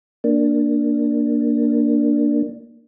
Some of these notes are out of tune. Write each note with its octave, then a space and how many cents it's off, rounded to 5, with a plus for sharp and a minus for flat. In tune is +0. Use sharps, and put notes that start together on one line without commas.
A#3 +0 D4 +0